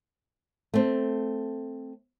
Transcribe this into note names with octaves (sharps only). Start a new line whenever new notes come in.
A3 C4